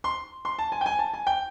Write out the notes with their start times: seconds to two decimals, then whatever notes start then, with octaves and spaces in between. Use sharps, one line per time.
0.04 C6
0.45 C6
0.59 A5
0.72 G#5
0.81 G5
0.86 G#5
0.99 A5
1.14 G#5
1.27 G5